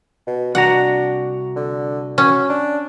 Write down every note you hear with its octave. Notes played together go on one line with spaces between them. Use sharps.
B2
C2 D4 F#4 F#5 A#5
D3
F#3 C#4
D4